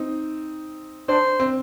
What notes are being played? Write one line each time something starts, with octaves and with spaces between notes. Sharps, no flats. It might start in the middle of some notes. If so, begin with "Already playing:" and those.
Already playing: C4 D#4
D4 C5
C4